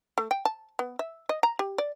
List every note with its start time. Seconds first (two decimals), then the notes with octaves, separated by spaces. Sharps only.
0.18 A3
0.31 G5
0.45 A5
0.79 B3
0.99 E5
1.29 D#5
1.43 A#5
1.59 G4
1.78 D5